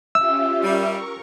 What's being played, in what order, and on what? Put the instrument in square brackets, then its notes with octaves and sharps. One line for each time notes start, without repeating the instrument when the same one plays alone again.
[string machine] C#4 F4 G4 [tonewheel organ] E5 [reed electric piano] E6
[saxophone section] G3 [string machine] A#4 C#6